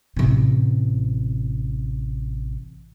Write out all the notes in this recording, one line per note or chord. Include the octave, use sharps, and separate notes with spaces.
A1 C3